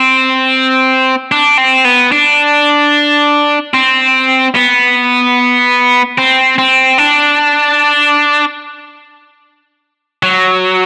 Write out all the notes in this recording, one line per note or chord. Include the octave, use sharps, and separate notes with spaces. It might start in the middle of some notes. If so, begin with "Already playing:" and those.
Already playing: C4
D4
C4
B3
D4
C4
B3
C4
C4
D4
F#3